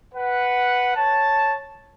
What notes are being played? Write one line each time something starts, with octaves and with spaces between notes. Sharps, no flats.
B4 F#5
C#5 A5